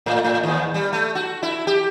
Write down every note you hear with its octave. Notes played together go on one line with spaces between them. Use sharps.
A2
A2
D#2
G3
A3
F#4
E4
G4